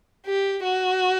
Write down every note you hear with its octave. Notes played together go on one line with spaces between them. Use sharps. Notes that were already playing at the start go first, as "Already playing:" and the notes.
G4
F#4